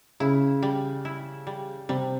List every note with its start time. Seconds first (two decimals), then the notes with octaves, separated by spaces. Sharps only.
0.20 C#3 E4
0.63 G3
1.05 E4
1.47 G3
1.89 C3 G3